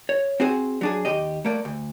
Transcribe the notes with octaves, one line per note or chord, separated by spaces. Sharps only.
C#5
C4 F#4 G#4 C5 G#5
F#3 D4 G#4
D#2 G4 D#5
A3 A#3 D5
D2